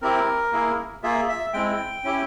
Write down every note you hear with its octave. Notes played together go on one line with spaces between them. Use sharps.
C4 E4 G4 A#4
A#3 E4 G#4
A#3 F4 G#4 E5
E5
G#3 C4 E4 G5
C#4 E4 G4